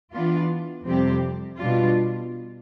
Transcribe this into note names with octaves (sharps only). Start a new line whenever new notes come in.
E3 B3 D4 F4
F2 C3 G3 C4 G4
B2 G3 D4 F4